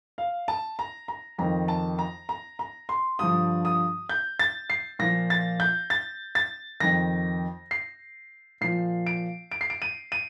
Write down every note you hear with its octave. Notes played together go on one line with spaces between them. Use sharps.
F5
A5
A#5
A#5
F2 D#3 A#5
A5
A#5
A#5
A#5
C6
G2 D3 F3 D#6
D#6
G6
A6
C7
A#2 F3 A#6
A6
G6
A6
A6
F2 D#3 A#6
C7
A#2 F3 C7
D7
D7
C7
D7
D#7
D#7